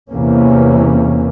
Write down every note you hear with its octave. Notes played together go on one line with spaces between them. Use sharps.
E2 C3 E3 A#3 C#4